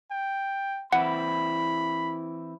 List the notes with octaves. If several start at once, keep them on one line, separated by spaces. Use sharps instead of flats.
G5
E3 C4 E4 F#5 B5